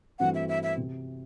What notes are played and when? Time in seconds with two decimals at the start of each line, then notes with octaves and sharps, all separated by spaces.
0.19 G2 E3 A3 C4 F#4 F#5
0.35 E5
0.49 E5
0.63 E5
0.77 C3